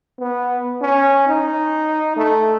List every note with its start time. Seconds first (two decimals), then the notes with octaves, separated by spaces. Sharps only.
0.19 B3
0.82 C#4
1.27 D#4
2.17 A3